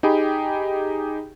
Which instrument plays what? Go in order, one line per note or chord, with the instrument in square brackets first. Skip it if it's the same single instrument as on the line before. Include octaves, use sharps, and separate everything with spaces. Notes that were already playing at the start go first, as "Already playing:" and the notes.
[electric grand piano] D#4 G4 G#4 G5 B5